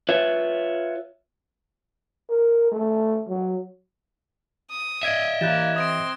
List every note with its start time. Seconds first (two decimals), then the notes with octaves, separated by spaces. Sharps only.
0.09 F4 B4 C#5 E5
2.29 A#4
2.72 A3
3.28 F#3
4.71 D#6
5.03 D#5 E5 E6 G#6 D7
5.41 E3 A#3 E4 G4 F#6 G6 A6 E7
5.76 C4 C6 D#6 A#6 D7